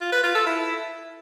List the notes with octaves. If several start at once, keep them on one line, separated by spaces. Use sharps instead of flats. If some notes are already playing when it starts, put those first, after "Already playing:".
F4
B4
F4
A4
E4